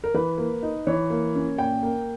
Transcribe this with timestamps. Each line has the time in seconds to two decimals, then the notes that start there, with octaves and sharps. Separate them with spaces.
0.04 A#4
0.14 E3 B4
0.38 A#3
0.63 D#4
0.87 E3 C#5
1.10 A#3
1.35 C#4
1.58 A#2 G5
1.83 A#3